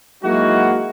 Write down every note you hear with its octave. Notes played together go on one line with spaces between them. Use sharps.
F#3 G#3 A#3 D#4 E4 F#4